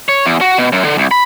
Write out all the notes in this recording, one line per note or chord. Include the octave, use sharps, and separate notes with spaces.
C#5
E2
F#4
B2
F#2
D3
C2
B5